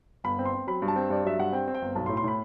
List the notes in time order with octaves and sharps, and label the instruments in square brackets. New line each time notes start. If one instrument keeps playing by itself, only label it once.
[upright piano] G1 B5
C4
C6
C4
F#3 B5
G2
A5
C4
G2 D5
F#3 E5
G2 F#5
C4 G5
C4
G5
G1
B1 A5
C6
A2
C6
A2 B5